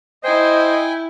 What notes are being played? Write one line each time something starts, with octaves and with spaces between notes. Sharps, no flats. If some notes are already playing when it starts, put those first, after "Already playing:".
E4 C5 D#5 G5 G#5